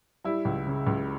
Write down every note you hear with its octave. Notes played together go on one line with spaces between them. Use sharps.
G3 E4
C#2
C#3
C#2